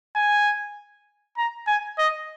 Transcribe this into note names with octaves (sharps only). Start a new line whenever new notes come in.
G#5
A#5
G#5
D#5